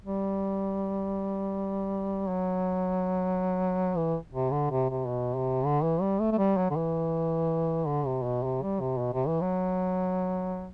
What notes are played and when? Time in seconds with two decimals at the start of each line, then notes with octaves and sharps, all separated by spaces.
0.05 G3
2.29 F#3
3.97 E3
4.34 C3
4.52 D3
4.71 C3
4.90 C3
5.08 B2
5.36 C3
5.65 D3
5.83 E3
6.01 G3
6.21 A3
6.32 A3
6.38 G3
6.57 F#3
6.71 D3
6.76 E3
7.87 D3
8.06 C3
8.24 B2
8.44 C3
8.63 G3
8.80 C3
8.99 B2
9.13 C3
9.27 E3
9.41 F#3